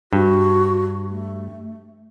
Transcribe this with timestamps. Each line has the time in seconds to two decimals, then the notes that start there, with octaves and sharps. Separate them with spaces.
0.13 G2 F#4
1.09 A3